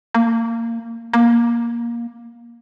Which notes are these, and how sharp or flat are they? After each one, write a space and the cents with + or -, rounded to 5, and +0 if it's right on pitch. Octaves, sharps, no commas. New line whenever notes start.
A#3 -20
A#3 +15